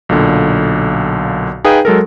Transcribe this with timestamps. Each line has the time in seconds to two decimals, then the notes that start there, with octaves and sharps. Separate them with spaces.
0.09 B1 A#2 D3
1.64 D#4 G#4 B4 F5 G5 D#6
1.85 F#3 G#3 A4 A#4